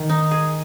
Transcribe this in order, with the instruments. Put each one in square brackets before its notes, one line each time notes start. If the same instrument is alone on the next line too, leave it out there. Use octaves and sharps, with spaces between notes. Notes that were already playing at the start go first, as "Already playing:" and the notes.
Already playing: [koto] D#3
D#4
G#4